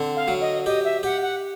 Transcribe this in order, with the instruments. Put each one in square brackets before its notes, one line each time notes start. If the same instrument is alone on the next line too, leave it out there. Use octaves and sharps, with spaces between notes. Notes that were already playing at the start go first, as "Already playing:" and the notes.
Already playing: [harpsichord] D3 C4
[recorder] F5
[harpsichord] F#3
[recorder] D#5
[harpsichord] G4 [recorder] D#5
[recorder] E5
[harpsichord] G4 [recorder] F#5
[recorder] F#5